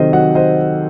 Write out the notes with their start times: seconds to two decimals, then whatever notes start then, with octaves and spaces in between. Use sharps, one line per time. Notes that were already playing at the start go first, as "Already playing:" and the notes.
Already playing: C3 D#3 F#3 A4 C5 D#5
0.13 F#3 D#5 F#5
0.35 C5 D#5